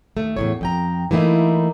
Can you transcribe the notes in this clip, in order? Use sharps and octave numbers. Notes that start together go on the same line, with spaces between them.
D#2 A3
E2 A2 C#5
F2 G5 A#5
E3 A3 A#3 D#4 E4